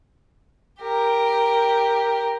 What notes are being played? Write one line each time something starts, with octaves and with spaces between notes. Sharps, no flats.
G4 A#4